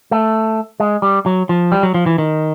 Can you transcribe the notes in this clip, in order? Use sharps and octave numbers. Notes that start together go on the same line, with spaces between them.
A3
G#3
G3
F#3
F3
G3
F#3
F3
E3
D#3